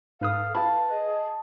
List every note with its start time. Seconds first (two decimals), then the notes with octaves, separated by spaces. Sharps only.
0.21 G#2 A4 B4 F5 D#6
0.55 E4 B4 F5 A5 B5
0.91 G#4 D#5